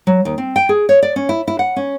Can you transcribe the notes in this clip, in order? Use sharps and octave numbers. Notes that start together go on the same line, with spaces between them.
F#3
D#2
C4
G5
G#4
C#5
D5
C#4
E4
E4
F#5
C#4